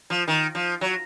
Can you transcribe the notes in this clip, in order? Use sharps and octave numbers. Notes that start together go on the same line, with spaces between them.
F3
D#3
F3
F#3